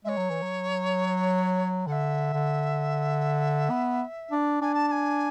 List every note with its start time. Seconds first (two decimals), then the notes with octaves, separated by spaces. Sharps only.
0.05 G#3 C#5 E5
0.18 F#3
0.30 E3
0.42 F#3
1.87 D3 F#5
1.92 E5
2.33 D3
3.70 B3
4.31 D4
4.61 D4 G#5
4.74 A5
4.88 A5
4.91 G#5